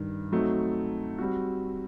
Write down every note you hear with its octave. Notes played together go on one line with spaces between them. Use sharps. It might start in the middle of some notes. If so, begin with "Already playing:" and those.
Already playing: G2 D#3
F#3 A3 C4 D#4 F#4
G3 C4 F#4